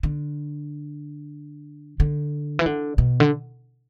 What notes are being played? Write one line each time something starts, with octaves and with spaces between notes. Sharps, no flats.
D3
D3
E3
D3
B2
D3